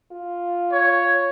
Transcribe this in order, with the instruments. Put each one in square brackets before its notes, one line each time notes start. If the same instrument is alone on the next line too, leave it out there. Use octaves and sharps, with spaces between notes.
[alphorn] F4
[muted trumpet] C#5